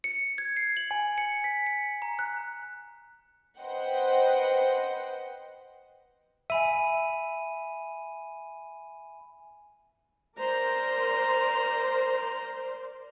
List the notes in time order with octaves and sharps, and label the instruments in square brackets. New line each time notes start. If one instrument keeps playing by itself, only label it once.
[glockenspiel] C#7
G#6
C7
F#7
G#5
C#7
B6
C#7
A#5
F#6
[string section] B4 C5 D#5 F#5 G5
[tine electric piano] E5 [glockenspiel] G#5 B5 D#7
[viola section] A#4 C5 D5 [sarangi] A#5